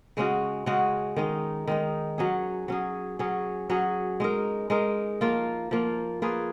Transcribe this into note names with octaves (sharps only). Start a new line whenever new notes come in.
C#3 G#3 C#4 F#4
C#3 G#3 C#4 F#4
D#3 G#3 D#4
D#3 G#3 D#4
F#3 C#4 G#4
F#3 C#4 G#4
F#3 C#4 G#4
F#3 C#4 G#4
G#3 D#4 A#4
G#3 D#4 A#4
F3 A#3 F4
F3 A#3 F4
A#3 F4 G#4 B4